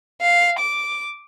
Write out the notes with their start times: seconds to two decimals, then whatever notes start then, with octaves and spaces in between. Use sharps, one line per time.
0.21 F5
0.59 D6